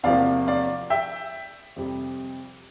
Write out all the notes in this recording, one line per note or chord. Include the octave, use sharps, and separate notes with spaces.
E2 C3 F3 A#3 D5 F5
D5 F5
E5 G5
F2 C3 G3